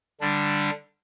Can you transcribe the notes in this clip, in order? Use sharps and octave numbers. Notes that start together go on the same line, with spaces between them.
D3 G3 D4